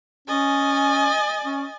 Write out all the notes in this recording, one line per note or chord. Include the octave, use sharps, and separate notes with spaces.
C#4 D#5 G#5 A6
C#4